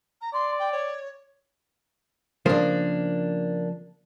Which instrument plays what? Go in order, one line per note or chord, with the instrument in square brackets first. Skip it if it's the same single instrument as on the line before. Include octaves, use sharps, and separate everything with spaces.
[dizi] A#5
[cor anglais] D5 [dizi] C6
[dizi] G5
C#5
[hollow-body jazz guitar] C#3 F3 C5 [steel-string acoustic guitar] A#3 D4